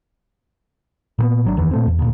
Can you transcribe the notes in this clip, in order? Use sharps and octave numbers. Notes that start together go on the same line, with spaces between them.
A#2 A#3 B3
G#1 F#3 D4
F#1 E2 D#3 E3
A#2 A3 C4
E2
D2 A#2